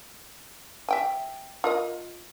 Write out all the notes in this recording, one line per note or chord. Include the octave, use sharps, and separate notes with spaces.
E5 G5 G#5
F4 A#4 D#5